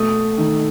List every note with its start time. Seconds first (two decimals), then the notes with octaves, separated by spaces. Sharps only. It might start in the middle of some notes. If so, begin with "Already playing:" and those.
Already playing: B2 A3 D#6
0.38 D#3